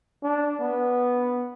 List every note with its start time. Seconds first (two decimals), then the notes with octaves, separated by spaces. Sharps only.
0.23 D4
0.61 B3